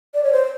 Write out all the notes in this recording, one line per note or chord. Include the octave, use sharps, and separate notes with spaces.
D5
C#5
C5